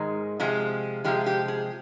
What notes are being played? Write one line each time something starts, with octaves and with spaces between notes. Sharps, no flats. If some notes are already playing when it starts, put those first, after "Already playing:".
Already playing: G#2 D#3 G#3
C3 F3 G#3
C3 F3 G#3 G4
G4
G#4